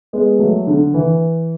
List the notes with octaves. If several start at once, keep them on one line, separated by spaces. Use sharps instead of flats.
G#3 B3
F#3 A3
D3
E3